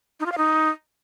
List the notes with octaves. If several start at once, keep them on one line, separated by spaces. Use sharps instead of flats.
D#4
F4
F5
D#4